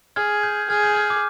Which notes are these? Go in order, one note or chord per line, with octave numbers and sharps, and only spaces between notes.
G#4 F6 G#6
G6
G#4 F6 G#6
G6
F6
D6